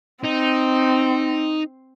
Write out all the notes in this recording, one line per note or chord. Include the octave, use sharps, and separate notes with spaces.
C4 D#4